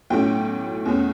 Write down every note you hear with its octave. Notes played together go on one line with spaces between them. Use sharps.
B1 A2 F#3 A3 C#4 G5
E2 B2 A3 C#4